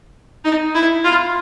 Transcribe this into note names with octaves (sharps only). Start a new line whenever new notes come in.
D#4
E4
F4